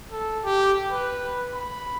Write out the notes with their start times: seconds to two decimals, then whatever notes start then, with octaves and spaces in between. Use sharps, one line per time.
0.12 A4
0.44 G4
0.92 B4
1.54 B5